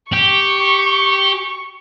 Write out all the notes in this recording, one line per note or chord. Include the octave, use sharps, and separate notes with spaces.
G4 C#6